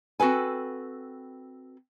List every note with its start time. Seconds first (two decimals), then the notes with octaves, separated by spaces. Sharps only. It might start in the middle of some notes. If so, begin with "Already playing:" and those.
0.20 C4 F#4 A4 B4 G#5